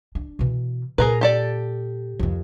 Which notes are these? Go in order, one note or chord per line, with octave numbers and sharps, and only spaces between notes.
D4
B2 E3
A#2 G#4 A#4 B4
G4 A4 D5
F2 D#3